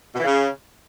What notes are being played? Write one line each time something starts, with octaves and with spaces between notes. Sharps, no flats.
B2
E3
C#3